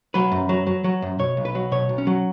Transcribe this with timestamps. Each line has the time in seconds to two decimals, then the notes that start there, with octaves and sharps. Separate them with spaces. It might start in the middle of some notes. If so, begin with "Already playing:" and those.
0.14 F#3 B4
0.32 F#2
0.49 F#3
0.67 F#3
0.84 F#3
1.02 F#2
1.19 B2 C#5
1.37 B1
1.45 B4
1.55 F#3
1.72 B2 C#5
1.89 B1
1.98 C#4
2.07 F#3